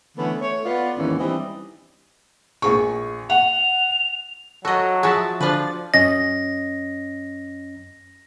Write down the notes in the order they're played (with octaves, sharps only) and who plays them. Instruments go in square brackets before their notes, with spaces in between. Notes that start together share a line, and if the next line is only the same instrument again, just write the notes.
[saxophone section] D3 E3 A3 B3 C#4
A3 C#5
B3 F4 D5
D#2 G#2 D#3 E3 C#4
E3 G3 C4 D4 D#4 D#5
[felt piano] A#1 G#4 C#6
[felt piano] F#5 [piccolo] F7
[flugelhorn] F#3 [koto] F#4 D#5 [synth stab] A4
[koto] F3 F#4 [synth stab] G#4 E5 A5
[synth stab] D3 A6 [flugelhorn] F3 [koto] D4 B4
[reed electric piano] F#2 C#4 D#5 [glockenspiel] A#6